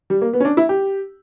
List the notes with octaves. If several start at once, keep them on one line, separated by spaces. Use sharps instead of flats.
G3
A#3
B3
C#4
D4
E4
G4